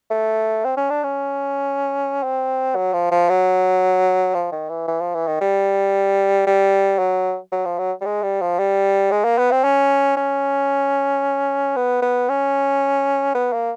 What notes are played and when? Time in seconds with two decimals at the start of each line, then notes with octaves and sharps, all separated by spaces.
0.10 A3
0.65 C4
0.77 C#4
0.90 D4
1.04 C#4
2.23 C4
2.76 F#3
2.94 F3
3.11 F3
3.29 F#3
4.34 F3
4.52 D#3
4.69 E3
4.88 E3
5.01 F3
5.15 E3
5.27 D#3
5.41 G3
6.47 G3
6.99 F#3
7.52 F#3
7.65 F3
7.79 F#3
8.01 G3
8.05 G#3
8.23 G3
8.41 F3
8.59 G3
9.11 G#3
9.25 A#3
9.38 B3
9.52 C4
9.64 C#4
10.17 C#4
11.76 B3
12.02 B3
12.29 C#4
13.34 B3
13.53 A#3